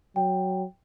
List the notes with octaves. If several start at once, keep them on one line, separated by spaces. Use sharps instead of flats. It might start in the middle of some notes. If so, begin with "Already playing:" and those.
F#3 G5